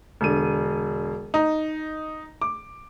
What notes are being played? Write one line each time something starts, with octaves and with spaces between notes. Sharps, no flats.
E1 D3 D#7
D#4 A#5
D6